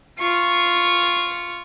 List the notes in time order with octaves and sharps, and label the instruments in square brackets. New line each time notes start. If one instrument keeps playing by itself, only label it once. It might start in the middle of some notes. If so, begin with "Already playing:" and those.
[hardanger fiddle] F4 C#6